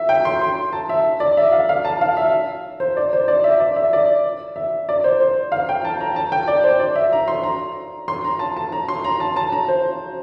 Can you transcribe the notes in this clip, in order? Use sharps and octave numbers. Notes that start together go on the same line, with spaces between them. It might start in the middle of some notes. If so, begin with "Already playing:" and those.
Already playing: E5
G5
C6
C6
A5
E5
D5
E5
F5
F5
A5
F5
E5
C5
D5
C5
D5
E5
D5
E5
D5
E5
D5
C5
C5
F5
G5
A5
A#5
A5
G5
D5
C5
D5
E5
A#5
C6
A#5
C6
A#5
A5
A5
A#5
C6
A#5
A5
A5
A#5
C5